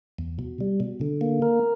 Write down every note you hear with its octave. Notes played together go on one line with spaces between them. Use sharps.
E2
B2
G3
B2
D3
A#3
A#4